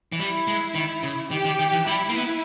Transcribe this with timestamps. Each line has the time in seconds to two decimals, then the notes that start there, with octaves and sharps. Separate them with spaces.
0.12 E3
0.19 G3 E4
0.47 G#3
0.75 D#3
1.03 C#3
1.31 D#3 G4
1.45 D#3
1.59 D#3
1.72 E3
1.86 G3 E4
2.09 A#3
2.14 B3